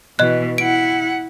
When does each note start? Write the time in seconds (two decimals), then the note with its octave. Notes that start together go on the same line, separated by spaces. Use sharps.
0.19 B2 E3 D#5 F#6
0.58 E4 F#5 D7